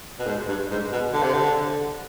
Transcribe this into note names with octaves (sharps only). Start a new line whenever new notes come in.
B2
G#2
G2
G#2
B2
D3
C3
D3